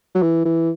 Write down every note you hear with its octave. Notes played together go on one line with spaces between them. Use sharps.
F#3
E3
E3